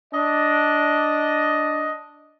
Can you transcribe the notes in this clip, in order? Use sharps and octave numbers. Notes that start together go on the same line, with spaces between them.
D4 D#5